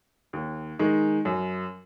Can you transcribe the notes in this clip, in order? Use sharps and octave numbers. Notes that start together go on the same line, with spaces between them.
D#2
D#3 G#3 D#4
F#2